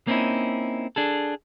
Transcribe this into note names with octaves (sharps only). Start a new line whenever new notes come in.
A#3 C4 C#4 D#4 E4
D4 G#4 A4